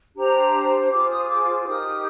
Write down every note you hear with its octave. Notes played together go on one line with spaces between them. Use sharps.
D4 G4 C5 A#5
F4 G#4 C5 D6
D#6
D#6
D6
D#4 G4 A#4 D#6